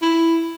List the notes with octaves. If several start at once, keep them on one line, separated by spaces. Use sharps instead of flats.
E4